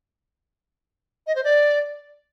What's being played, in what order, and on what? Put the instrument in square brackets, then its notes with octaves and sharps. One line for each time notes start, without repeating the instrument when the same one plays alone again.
[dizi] D#5
C5
D5